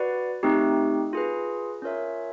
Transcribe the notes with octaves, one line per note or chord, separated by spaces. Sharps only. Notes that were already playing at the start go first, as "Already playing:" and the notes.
Already playing: F#4 B4 D5 F#5
A3 C4 D#4 G4
F4 G#4 B4
C#4 F4 A#4 C#5 E5